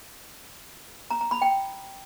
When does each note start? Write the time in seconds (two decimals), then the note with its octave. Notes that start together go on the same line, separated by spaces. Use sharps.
1.10 A#5
1.21 A#5
1.31 B5
1.42 G5